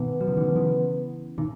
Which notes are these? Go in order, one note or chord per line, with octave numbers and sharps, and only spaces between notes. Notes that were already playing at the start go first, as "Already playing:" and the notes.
Already playing: B2 D#3 B3
F#3
C#3 E3
D#3 F#3
D#3
C#3 E3
B2 D#3